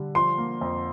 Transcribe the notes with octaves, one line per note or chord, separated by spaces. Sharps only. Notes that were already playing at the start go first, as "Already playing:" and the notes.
Already playing: D3 G3
F3 C6
A#3
F2